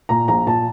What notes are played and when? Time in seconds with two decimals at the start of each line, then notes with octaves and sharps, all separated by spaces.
0.09 A#2 A#5
0.28 A#1 A#5
0.46 A#2 A5